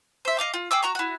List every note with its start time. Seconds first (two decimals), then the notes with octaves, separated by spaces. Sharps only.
0.25 C5 E5
0.38 D#5 F5 D6
0.54 F4
0.71 G#4 G5 D6 E6
0.83 F#4 A#5 C#6
0.95 E4 F#4